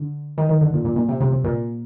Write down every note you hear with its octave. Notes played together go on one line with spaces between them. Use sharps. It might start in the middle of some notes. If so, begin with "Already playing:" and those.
Already playing: D3
D#3
D#3
D3
A#2
A#2
A#2
C3
C3
C3
A#2